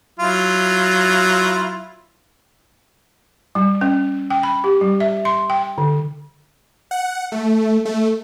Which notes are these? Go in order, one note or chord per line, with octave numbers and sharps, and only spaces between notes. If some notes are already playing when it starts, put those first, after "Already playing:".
F#3 E4 F4
G3
C#4
G5
B5
G4
G3
E5
C6
G5
D3
F#5
A3
A3